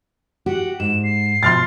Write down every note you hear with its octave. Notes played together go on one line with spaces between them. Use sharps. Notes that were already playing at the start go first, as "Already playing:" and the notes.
F#4 G4 F#5
G#2 E7
C7
B2 F3 C6 F6 A6